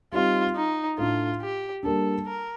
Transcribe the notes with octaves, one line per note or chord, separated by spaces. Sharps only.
G3 C4 D#4 F4 G4
D#4
A2 A3 D4 F4
G4
G3 A#3 D4 A4
A#4